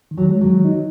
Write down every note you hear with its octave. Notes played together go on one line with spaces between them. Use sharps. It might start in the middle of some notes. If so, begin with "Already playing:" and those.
D#3
F#3
G#3
F#3
D#3
D#4